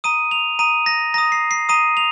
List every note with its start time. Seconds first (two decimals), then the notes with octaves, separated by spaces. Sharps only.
0.04 A#5 D#6 D#7
0.31 F7
0.59 A#5 D#6 D#7
0.86 A#6
1.14 A#5 D#6 A#6
1.32 C7
1.51 C7
1.69 A#5 D#6 D#7
1.97 F7